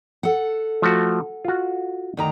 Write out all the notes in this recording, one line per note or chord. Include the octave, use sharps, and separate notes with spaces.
A4 F#5
F3 A3 F#4
F4 F#4
D2 D#3 A#5